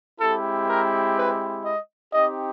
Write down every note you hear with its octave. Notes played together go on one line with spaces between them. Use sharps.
G#3 C4 E4 G4 A4
A#4
B4
D#5
C4 D#4 G4 D#5